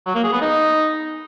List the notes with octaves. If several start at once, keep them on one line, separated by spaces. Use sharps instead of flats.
F#3
A#3
G#4
B3
D#4